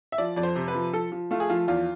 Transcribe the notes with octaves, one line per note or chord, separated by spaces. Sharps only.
E5
F3 D5
F2 D5
C5
C3
B4
F3
F3 A4
F3
A3 F4
G#4
F3 F4
E2 F4